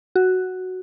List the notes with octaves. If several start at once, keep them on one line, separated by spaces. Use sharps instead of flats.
F#4